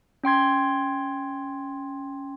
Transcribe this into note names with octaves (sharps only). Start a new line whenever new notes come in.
C#4 G5 C6 G#6